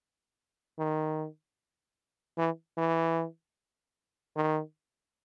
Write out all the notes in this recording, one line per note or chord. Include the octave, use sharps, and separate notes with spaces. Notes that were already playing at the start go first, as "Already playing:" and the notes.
D#3
E3
E3
D#3